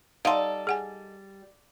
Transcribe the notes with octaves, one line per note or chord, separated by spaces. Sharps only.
G3 D#4 A4 F5 F#5 C6
G#4 F#5 G#5